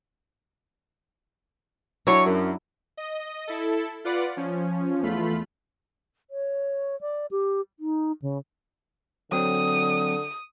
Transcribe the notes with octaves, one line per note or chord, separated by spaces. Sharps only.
F#3 D4 E4 C#5
F#2
D#5
E4 A4
F4 B4 D5 F#5
F3 C#4
E2 A3 F4 B5
C#5
D5
G4
D#4
C#3
D3 F#3 C4 D#6